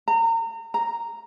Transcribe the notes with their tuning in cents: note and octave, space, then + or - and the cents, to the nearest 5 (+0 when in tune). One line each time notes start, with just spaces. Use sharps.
A#5 -30
A#5 -5